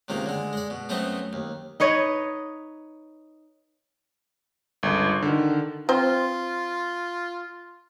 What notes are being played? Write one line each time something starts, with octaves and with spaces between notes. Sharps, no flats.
C#2 C3 D#3 A#3
D3 G#3
G#3 D5
B2
F#2 A3 B3 C4 D#5
D#2
D#4 B4 C#5 D#5
G1 C#2
D3 D#3
C4 F4 C5